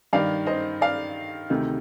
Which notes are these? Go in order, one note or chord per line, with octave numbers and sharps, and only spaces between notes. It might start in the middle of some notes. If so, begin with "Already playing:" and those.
G2 D#3 D5 F5
C5 D#5
D5 F5
D2 C3 D#3